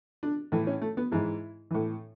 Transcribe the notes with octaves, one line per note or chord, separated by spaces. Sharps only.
D4
A2 E3
C#4
A3
B3
G#2 E3 E4
A2 E3